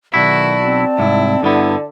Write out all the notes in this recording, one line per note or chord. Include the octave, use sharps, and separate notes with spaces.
B1 D#3 E4 F#4 D5 A5
C4
C2 G#2 E4
G2 D3 B3 E4